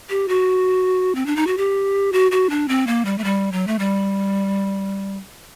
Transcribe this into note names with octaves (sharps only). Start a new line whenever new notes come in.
G4
F#4
C4
D4
D#4
F#4
G4
F#4
F#4
D4
C4
A#3
G3
A3
G3
F#3
A3
G3